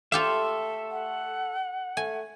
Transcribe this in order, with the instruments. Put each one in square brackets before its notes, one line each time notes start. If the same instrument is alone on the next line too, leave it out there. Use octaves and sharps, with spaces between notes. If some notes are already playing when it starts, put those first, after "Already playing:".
[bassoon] A3 [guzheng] F4 G4 F5 [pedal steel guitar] A4 E5
[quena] F#5
[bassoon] A3 [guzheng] G#5